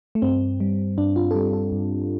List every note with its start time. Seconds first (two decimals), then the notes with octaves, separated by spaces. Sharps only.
0.15 A3
0.22 G2 C4
0.60 G3
0.98 G2 D4
1.16 F4
1.31 A4
1.35 G3 G4
1.53 A4
1.72 G2